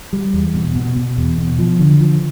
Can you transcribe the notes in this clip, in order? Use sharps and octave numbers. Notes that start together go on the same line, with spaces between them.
G3
E2
B2
B2
B2
E2
B2
F3
D3
F3